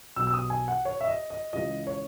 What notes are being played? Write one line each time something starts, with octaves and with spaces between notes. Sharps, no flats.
B1 B2 E6
E6
D#6
G#5
F#5
C#5
E5
D#5
D#5
C#2 C#3 E3 D#5
C#5